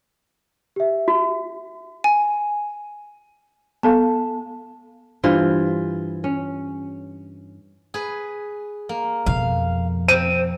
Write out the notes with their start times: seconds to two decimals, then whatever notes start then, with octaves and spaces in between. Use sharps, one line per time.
0.76 G4 E5
1.08 F#4
2.04 G#5
3.83 B3 A4 F5 A5
5.23 G2 E3 F4 C5
6.24 C#4
7.94 G#4 B4
8.89 A#3
9.26 F2 B2 F5
10.08 C4 D#7